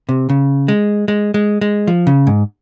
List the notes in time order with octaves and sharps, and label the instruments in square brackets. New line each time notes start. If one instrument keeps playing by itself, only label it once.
[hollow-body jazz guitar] C3
C#3
G#3
G#3
G#3
G#3
F3
C#3
G#2